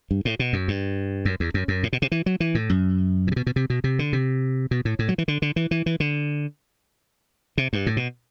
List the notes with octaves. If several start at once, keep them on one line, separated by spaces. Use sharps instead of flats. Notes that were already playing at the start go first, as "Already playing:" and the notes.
G2
A2
B2
F#2
G2
F#2
E2
F#2
F#2
A2
B2
C3
E3
F#3
E3
A2
F#2
A2
C3
B2
B2
C3
B2
C3
D3
C3
B2
A2
A2
F#3
E3
D3
D3
E3
E3
E3
D3
C3
G2
A2
B2